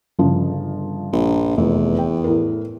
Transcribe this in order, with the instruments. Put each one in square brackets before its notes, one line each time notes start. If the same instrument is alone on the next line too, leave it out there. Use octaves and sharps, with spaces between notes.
[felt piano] G1 C#3 F3
[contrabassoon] A#1
[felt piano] F1 [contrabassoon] E2
[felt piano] G5
A2 A#4